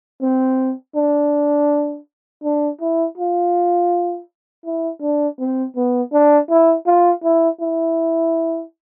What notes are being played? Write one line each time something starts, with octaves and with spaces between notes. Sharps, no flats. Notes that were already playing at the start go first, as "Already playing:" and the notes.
C4
D4
D4
E4
F4
E4
D4
C4
B3
D4
E4
F4
E4
E4